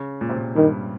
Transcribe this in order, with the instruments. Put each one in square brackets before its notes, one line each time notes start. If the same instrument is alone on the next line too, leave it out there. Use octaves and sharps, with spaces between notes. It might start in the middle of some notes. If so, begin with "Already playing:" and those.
Already playing: [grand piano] C#3
A#2
C3
A#2
[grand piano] G2 [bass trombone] D#3